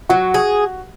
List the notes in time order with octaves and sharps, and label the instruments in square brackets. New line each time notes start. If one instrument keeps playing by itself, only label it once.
[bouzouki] F#3 [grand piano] F#4
[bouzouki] G#4